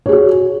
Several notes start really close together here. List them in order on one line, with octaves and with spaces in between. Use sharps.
C#5 G#4 F#4